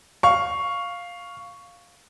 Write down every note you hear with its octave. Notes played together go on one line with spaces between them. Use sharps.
F5 C#6